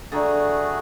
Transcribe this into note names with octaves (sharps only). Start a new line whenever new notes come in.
D3 A3 F#4 G#4 D5 A#5 A6